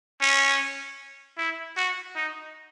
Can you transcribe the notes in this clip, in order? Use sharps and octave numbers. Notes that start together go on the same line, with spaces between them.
C#4
E4
F#4
D#4